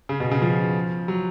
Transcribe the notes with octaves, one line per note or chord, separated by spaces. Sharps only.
C#3
B2
C#3
F3
F#3